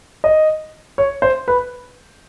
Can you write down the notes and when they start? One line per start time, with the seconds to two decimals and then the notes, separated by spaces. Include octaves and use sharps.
0.24 D#5
0.98 C#5
1.22 C5
1.48 B4